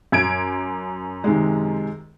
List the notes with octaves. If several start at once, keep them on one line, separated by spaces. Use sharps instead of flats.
F#2 G#6 D7
C3 D#3 G#3